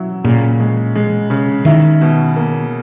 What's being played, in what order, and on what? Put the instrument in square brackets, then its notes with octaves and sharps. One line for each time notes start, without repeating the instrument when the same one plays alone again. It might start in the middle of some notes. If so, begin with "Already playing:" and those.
Already playing: [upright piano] F#3 E4
[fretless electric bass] A#2 [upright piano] C#3
[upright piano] G#3
G#3
C#3
[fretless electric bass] D#3 [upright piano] E4
[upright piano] B2
A#3